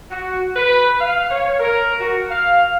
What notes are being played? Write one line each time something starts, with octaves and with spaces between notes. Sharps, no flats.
F#4
B4
F5
C#5
A#4
F#4
F5